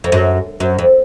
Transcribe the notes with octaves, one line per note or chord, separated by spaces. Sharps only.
F2
F#2
F#2
F2